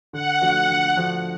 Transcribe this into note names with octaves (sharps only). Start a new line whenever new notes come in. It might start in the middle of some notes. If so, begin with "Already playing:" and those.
D3 F#5
F3 A3 D4 F#4
D3
F3 A3 D4 F#4